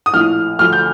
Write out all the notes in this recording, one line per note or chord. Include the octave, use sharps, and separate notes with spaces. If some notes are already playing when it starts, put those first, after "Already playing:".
D#6
A#1 A2 F3 F6
D2 D3 F3 F6
G6